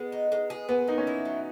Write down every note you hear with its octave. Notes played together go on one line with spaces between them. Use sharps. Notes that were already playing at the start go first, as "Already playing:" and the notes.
Already playing: G#3 B3
D#4
G#3
G#4
A#2 B3
A#3 D#4
C#4
E4
F#3